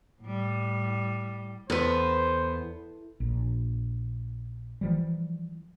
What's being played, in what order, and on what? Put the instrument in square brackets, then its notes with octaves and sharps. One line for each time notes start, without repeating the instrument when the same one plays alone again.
[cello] A2 G3
[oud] E2 [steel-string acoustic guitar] B3 B4 [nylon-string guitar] A4 [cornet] C5
[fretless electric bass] A#1
E3 F3 G3